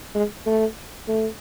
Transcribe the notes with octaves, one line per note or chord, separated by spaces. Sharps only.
G#3
A3
A3